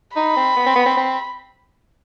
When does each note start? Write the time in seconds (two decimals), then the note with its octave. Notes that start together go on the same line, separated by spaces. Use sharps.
0.16 D#4 B5
0.37 C4
0.57 B3
0.67 C4
0.76 B3
0.86 C4
0.97 C4